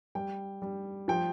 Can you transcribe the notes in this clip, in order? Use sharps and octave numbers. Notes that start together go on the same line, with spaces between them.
G3 G5
G3
F3 G5